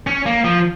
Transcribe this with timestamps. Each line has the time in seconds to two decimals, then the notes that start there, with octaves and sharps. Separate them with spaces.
0.07 C#4
0.26 A#3
0.44 F3